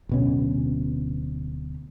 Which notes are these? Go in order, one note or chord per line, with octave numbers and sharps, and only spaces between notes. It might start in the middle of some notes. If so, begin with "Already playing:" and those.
D1 B2 C#4